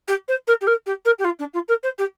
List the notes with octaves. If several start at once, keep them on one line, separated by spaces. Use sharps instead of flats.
G4
C5
A#4
G4
A#4
G4
A#4
G4
F4
D4
F4
A#4
C5
G4